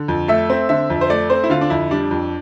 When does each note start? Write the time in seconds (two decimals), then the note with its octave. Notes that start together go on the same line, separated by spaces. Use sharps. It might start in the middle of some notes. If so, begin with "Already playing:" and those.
Already playing: D3
0.08 F2
0.28 A3 E5
0.50 C4
0.69 D3 E5
0.90 F2
1.01 C5
1.10 A3 D5
1.30 C4 C5
1.44 E4
1.50 D3 F4
1.61 D4
1.70 F2 E4
1.90 G3 D4
2.11 F2